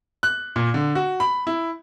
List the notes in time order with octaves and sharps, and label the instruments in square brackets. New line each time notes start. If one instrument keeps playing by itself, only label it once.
[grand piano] F#6
A#2
D3
F#4
B5
E4